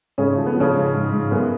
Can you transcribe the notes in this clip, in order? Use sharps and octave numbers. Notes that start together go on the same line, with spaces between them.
G#2 C#3 C#4
A3
F3
B3
C#3 F3 C#4
G#2
G#2
G#2
F#2 B3